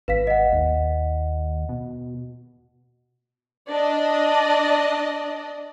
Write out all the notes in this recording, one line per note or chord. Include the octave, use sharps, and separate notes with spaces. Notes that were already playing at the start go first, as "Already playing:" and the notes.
G#1 B4 F5 B6
D#5 F#5
D#2
B2
D4 D5 D#5